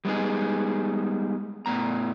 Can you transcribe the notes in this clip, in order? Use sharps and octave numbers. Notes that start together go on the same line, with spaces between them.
G3 G#3 B3 D#4 G#4
A2 B3 A#5